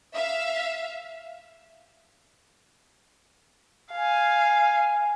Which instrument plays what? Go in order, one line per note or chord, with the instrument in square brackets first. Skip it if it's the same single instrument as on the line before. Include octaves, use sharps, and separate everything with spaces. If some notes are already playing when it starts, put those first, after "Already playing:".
[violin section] E5 F5
[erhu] F5 [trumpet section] G#5